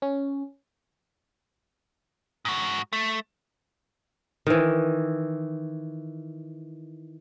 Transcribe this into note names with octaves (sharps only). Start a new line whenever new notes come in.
C#4
G#2 F#4
A3
D#3 E3